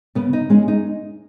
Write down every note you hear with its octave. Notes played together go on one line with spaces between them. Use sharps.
C#3 B3
D#4
G#3 C#4
D#4